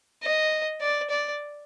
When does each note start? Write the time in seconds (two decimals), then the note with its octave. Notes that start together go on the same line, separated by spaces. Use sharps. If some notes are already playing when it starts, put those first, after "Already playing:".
0.23 D#5
0.81 D5
1.10 D5